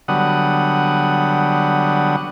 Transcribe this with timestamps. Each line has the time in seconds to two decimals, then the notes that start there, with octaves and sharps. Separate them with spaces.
0.08 D3 F#3 G3 B3 F#5 D#6